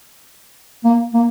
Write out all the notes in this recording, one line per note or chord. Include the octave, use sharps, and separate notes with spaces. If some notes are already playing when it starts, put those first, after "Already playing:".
A#3
A#3